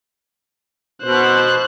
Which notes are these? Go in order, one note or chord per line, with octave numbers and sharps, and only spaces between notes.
B2 C5 F#6